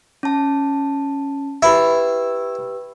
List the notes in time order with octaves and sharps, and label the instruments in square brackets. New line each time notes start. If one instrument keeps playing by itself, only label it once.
[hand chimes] C#4 A5
[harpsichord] E4 [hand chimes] G4 B4 E6